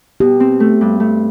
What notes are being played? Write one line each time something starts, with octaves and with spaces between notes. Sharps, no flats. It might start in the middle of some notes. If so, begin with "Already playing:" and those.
B2 G4
C4
A3
G2
A3